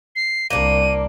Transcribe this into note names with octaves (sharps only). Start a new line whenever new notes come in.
C7
C2 A#3 D4 D#7